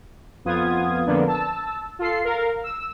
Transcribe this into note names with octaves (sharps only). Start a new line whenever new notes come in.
F2 B3 F4 D#6 G#6
F2 D3 A#3 B3 D4
A5 E6
F4 A4 C7
A#4 F5
E6